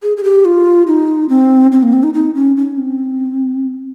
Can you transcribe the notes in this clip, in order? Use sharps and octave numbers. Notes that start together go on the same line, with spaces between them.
G#4
G#4
G4
F4
D#4
C4
C4
A#3
C4
D#4
D#4
C#4
C#4
C4